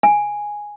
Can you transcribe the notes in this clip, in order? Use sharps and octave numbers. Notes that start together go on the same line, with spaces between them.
G#5